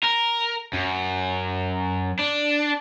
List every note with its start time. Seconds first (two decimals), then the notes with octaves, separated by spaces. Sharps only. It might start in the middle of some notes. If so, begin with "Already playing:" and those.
0.04 A#4
0.73 F#2
2.19 D4